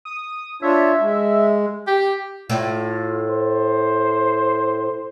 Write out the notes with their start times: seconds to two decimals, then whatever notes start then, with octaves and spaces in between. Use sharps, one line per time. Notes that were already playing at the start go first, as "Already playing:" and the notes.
0.05 D#6
0.62 D4 F4 C#5 E5
1.01 G#3
1.87 G4
2.50 A2 F4
3.30 C5